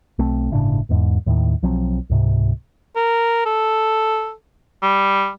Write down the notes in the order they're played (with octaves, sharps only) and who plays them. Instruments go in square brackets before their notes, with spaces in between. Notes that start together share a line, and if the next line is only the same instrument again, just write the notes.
[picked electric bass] B1 A3 C4
G1 A2 C#3 D4
E1 E2 G#2
D#2 A2 D#3
B1 F3 F#3 C4
C#2 G#2 C3
[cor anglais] A#4
A4
G3